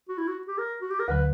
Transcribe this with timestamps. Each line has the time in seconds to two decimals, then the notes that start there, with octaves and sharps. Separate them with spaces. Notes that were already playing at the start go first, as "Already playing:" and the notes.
0.09 F#4
0.18 E4
0.28 F#4
0.47 G4
0.58 A#4
0.81 F#4
0.90 G4
1.00 A#4
1.08 D2 D3 F#3 B4